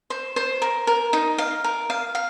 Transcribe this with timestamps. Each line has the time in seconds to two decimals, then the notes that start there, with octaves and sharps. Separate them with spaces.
0.10 C5
0.36 C5
0.62 A#4
0.87 A#4
1.13 D#4
1.38 F5
1.64 A#4
1.90 F5
2.15 F5